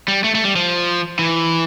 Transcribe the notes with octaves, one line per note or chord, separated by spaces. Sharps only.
G3
A3
A3
G3
F3
E3